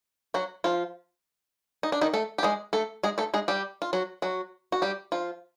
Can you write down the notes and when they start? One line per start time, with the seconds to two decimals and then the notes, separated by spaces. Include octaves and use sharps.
0.34 F#3 F#4
0.64 F3 F4
1.83 D#4
1.92 D4
2.01 D#3 D#4
2.13 A3 A4
2.38 G4
2.43 G#3 G#4
2.73 A3 A4
3.03 G#3 G#4
3.18 A3 A4
3.34 G#3 G#4
3.48 G3 G4
3.82 F4
3.93 F#3 F#4
4.22 F#3 F#4
4.72 F#4
4.82 G3 G4
5.12 F3 F4